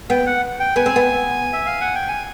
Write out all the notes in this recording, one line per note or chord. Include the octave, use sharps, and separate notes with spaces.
B3 G5
F#5
G5
B3 G#5
C4
B3
E5
F5
F#5
G5
G#5